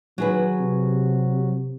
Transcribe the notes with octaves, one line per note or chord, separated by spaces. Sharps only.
D#3 F#3 G#4 B4
C3